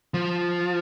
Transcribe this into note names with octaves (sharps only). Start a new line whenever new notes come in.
F3